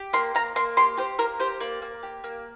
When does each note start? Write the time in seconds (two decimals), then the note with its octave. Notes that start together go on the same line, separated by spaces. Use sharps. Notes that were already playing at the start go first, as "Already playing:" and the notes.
Already playing: G4
0.13 A#3 C6
0.35 A#3 A#5
0.56 A#3 C6
0.77 G4 C6
0.97 G4 C5
1.19 A#3 A#4
1.40 G4 C5
1.60 A#3 D5
1.82 A#3
2.03 G4
2.24 A#3